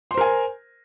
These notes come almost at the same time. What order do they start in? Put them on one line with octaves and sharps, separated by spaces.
C6 C5 A#4 G#5